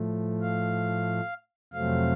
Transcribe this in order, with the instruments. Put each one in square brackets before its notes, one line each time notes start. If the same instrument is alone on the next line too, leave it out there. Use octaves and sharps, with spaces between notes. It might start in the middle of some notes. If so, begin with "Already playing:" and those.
Already playing: [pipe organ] A2 F3 A3
F5
F2 C3 F#3 A3 C4 F5